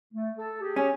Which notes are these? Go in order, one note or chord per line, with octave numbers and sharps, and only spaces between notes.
A3
A4 A5
G4 G#4
C#4